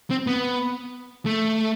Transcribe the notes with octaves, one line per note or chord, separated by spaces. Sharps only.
C4
B3
A3